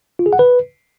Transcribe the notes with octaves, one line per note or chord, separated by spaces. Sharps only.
F4
G#4
F#5
B4